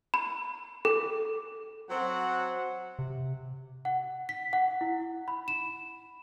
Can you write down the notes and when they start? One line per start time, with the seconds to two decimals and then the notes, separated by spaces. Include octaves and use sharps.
0.14 B5
0.85 A4
1.90 F#3 C4 F#5
2.99 C3
3.85 F#5
4.29 B6
4.53 F#5
4.81 E4
5.28 B5
5.48 E7